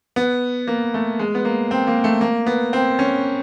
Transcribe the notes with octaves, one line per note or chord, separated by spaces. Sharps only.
B3
A#3
A3
G#3
B3
A#3
C4
A#3
A3
A#3
B3
C4
C#4